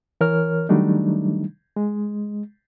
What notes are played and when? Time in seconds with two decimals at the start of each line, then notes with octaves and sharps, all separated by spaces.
0.21 E3 A#4 C#5 F6
0.69 D#3 F#3 G3 A3 D4 D#4
1.76 G#3